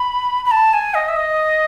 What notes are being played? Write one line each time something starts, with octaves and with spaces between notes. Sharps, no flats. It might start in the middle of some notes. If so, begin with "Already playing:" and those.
Already playing: B5
B5
A5
G#5
D#5
E5
D#5